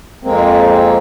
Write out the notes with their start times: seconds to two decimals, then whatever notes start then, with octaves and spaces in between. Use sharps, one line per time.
0.24 F2 G#3 A#3 C4